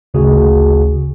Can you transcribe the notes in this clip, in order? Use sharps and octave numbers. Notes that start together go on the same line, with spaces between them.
G#1 D2 C#3 F#4 G#4